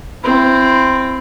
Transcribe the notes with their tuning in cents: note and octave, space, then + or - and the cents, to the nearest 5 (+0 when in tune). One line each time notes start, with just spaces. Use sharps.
C4 +0 E4 +25